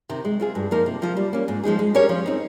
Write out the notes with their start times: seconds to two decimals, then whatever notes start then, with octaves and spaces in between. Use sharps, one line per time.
0.09 C3 D#3
0.25 G#3
0.40 C4 F4 G#4
0.55 G2
0.71 F3 A#3 D#4 A#4
0.86 C3
1.02 F3 A#3 F4
1.17 G3
1.33 A#3 C#4
1.48 G#2
1.63 F3 G#3 D#4 G#4
1.79 G#3
1.95 C#4 G4 A#4 C#5
2.09 F3
2.26 C4 D#4